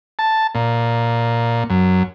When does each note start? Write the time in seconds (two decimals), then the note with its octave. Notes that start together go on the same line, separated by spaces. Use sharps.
0.19 A5
0.55 A#2
1.70 F#2